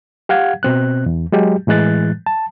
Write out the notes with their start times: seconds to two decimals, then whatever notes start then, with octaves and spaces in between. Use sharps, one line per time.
0.29 G4 F5 F#5 G#6
0.63 B2 C4 F#6
1.06 E2
1.32 F#3 G#3 G4
1.67 A2 E3 G#3 F#6 A6
2.26 A5